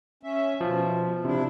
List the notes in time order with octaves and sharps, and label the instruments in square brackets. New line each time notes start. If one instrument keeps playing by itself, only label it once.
[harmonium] C#4 E5
[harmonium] B2 [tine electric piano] F3
[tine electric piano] C3 [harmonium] D4 E4